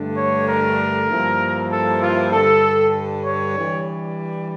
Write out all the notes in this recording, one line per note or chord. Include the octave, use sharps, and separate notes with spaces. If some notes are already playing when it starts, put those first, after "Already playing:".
Already playing: G2 D3 A3 D4
C#5
A#4
G2 F3 A#3 E4
A4
F4
G2 D3 G3 A4
C#5
E3 G3 D4